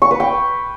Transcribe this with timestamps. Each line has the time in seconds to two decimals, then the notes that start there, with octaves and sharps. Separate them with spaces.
0.02 C#6
0.11 B4
0.20 G5